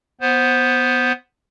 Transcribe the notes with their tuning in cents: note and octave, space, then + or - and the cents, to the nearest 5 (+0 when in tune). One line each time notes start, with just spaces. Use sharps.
B3 +0 C5 +5